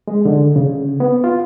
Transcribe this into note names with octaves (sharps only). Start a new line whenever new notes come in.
G#3
D3
C#3
B3
F4